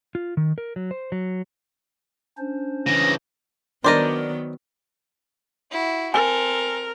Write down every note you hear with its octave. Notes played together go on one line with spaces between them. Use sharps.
F4
D#3
A#4
F#3
C5
F#3
C#4 D4 C5
C#3 E3 A#6
D#3 F#3 B3 D4 A#4 C5 D5 D#5
E4 F#4
C4 A4 A#4 G#5